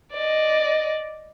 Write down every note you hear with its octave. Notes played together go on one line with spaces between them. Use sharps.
D5 D#5